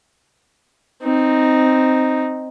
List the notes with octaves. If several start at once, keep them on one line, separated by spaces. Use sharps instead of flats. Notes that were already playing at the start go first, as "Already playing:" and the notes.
C4 D#4